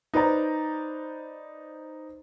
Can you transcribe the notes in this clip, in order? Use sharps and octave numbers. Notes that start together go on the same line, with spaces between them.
D#4 B4 C5 D5 A#5